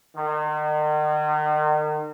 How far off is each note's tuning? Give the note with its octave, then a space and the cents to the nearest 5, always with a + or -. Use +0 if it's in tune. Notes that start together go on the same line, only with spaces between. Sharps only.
D#3 -40